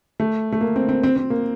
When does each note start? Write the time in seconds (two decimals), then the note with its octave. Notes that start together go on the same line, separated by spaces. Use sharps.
0.20 A3
0.52 A3
0.61 A#3
0.76 C4
0.89 C4
1.03 C4
1.16 C4
1.30 A#3